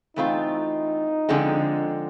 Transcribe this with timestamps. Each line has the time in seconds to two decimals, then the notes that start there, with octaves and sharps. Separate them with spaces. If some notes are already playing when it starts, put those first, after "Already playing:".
0.16 E3 A3 C4 D#4 F4
1.29 D3 F3 G#3 C4